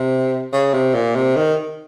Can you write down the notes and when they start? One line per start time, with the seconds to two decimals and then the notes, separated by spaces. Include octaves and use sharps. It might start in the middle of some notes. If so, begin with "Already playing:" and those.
Already playing: C3
0.53 C#3
0.74 C3
0.94 A#2
1.16 C3
1.36 D#3